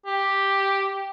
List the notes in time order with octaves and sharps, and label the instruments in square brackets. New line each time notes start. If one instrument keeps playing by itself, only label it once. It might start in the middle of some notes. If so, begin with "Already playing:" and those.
[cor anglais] G4